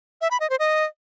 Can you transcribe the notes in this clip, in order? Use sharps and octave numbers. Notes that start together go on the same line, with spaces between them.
E5
B5
D#5
C5
D#5